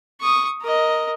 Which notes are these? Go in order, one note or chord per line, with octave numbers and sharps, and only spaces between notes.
C#6 D#6
A#4 D#5